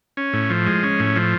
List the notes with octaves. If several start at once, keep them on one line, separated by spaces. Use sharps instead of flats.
C#4
A2
F3
G#3
C#4
A2
F3